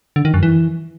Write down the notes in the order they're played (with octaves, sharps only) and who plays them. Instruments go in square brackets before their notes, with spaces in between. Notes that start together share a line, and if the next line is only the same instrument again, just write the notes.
[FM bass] D3
D#3
F#2
E3